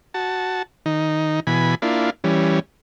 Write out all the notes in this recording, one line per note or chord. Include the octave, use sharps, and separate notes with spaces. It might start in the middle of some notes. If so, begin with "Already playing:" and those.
F#4 A5
D#3 D#4
B2 E3 G#5 B5
A#3 D4 E4 F4
E3 G3 C#4